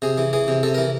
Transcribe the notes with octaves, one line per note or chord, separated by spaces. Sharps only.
C3 G#4
E3
E3 G#4
C3
C3 A4
E3 A#4